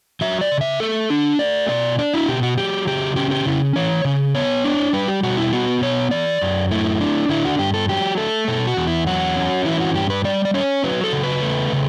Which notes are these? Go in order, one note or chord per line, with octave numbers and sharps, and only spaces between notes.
F#3 E5
D5
C#3
E5
A3 A4
D4
A3 D5
B2 D5
D4 D5
E4
B2 G4
F#4
F#3 G4
C#3 G4
C#4 G4
G4
C#3 E4
E3 C#5
C#3
B3 C#5
D4
G3 B4
G4
B2 F#4
E4
B3 F#4
B2 C#5
E3 D5
F#2
A3 E4
D4
D3 E4
F#4
G2 G4
A4
F#3 G4
A3 A4
B2 A4
F#4
E2
E4
F#3 F#4
C#4
E3 E4
F#4
G2 G4
B4
G3 D5
D5
C#4 C#5
F#3 B4
A4
C#3
B4
A3
C#3